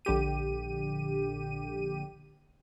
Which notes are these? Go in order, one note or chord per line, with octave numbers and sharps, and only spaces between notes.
A#1 D3 G4 D#7